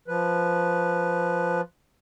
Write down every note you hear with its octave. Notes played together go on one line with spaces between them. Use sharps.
F3 B4